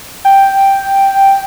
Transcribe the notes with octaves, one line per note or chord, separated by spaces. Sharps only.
G5